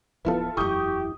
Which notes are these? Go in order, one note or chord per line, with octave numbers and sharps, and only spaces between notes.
D1 F3 B3 E4 F4 A4 B4
E1 F#2 E4 G4 C#6 D#6 G6